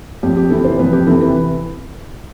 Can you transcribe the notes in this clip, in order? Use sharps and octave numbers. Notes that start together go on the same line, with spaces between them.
F2 G4
G4
C3 E3 A4
C5
F2 B4
G4
C3 E3 A4
B4